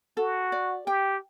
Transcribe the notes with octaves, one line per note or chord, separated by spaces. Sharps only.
F#4 A4
D5
G4 G5